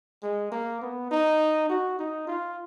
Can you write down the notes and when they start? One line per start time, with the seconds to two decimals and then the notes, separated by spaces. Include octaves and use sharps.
0.23 G#3
0.52 A#3
0.81 B3
1.11 D#4
1.69 F#4
1.99 D#4
2.27 F4